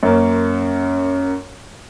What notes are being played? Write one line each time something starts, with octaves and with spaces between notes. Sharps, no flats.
F#2 A#3 C#4